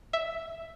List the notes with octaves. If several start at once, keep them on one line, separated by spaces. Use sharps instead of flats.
E5